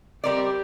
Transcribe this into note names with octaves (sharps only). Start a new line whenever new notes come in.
G3 C4 G4 A#4 D5